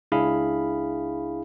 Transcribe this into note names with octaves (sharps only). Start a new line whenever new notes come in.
C#2 D4 E4 G#4 F5 B5